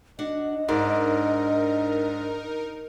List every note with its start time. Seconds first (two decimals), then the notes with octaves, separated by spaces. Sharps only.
0.19 D4 F#4 D#5 F#5
0.69 G#2 D4 D#4 A#4